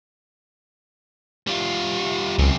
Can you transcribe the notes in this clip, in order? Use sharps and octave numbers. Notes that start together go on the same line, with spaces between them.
G3 F4
C#2 F#2 C3